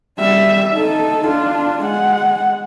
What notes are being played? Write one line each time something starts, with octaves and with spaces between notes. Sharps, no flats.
G3 E5
D#4 A4
D4 F4
G#3 F#5